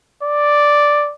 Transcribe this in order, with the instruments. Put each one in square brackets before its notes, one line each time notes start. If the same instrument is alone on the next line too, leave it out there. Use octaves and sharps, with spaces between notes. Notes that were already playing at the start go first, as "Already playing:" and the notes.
[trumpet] D5